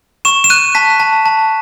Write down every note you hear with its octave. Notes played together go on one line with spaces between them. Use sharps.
C#6 E7
E7
F#6 D#7
A5 B6
A5
A5